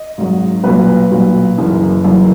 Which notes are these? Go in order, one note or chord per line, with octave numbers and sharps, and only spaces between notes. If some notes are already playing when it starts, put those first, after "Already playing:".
Already playing: D#5
G#1 G#2 F#3
B1 A#2 F#3 B4
B1 A#2 F#3
F#1 F#2 E3
F#1 F#2 E3